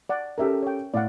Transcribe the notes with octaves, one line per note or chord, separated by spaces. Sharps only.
D5 F#5
C#4 G4 A4 A#4 E5 G5
C#5 G5
A2 D5 F5 F#5